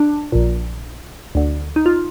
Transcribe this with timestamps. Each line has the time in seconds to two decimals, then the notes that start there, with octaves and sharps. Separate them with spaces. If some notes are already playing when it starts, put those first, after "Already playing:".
Already playing: D4
0.32 A#1 A#2
1.35 D2 D3
1.76 D#4
1.86 F4